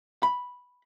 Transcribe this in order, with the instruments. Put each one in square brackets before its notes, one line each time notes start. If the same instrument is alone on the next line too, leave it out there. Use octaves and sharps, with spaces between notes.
[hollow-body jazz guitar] B5